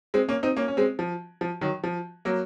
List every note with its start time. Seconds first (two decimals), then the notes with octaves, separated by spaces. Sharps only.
0.14 G#3 C4
0.29 A#3 C#4
0.43 C4 D#4
0.57 A#3 C#4
0.68 C#4
0.77 G#3 C4
0.99 F3
1.41 F3
1.61 D#3 F#3
1.84 F3
2.25 F#3 A#3